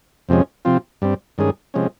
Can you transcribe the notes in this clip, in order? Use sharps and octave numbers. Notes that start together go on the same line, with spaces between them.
F2 C3 F3 G#3 C#4
C3 F3 C4 F4
G2 G3 C4
G2 D#3 G#3 C#4 G#4
C3 F3 G#3 C#4